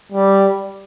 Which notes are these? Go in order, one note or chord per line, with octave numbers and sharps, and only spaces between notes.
G3